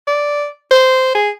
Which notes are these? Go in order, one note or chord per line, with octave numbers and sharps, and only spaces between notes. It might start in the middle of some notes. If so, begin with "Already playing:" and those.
D5
C5
G#4